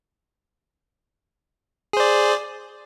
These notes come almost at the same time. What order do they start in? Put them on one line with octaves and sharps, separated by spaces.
G#4 C5 D5